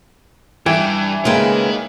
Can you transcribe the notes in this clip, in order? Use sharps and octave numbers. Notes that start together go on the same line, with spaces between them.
G2 E3 G5
C#3 G#3 A#3 D#4 A#4 B4 G5